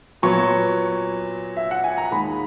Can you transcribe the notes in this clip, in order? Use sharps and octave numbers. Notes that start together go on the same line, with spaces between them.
A#2 F#3 B3 C#6
E5
F#5
G#5
A#5
D#2 D#3 G#3 B5